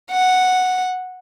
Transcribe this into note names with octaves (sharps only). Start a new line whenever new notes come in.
F#5